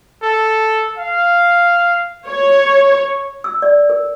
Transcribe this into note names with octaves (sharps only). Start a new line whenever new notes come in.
A4
F5
C#5
E6
D5
A#4